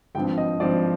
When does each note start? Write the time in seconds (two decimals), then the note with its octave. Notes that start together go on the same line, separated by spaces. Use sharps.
0.15 G#1 G2 F3 C4 G5
0.38 D#5
0.60 G#1 G2 F3 C4 D5